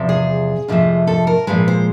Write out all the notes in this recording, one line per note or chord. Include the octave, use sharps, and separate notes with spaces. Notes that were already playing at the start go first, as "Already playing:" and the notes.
Already playing: E2 C3 F3
G#4
F2 C3 F3 A3
A4
A#4
A#2 F3 G#3 B4
C5